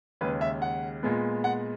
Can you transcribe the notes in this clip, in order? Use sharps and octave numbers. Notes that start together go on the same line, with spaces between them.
D#2 C#3 G#3 B4
E5
F#5
A#2 G#3 B3
F#5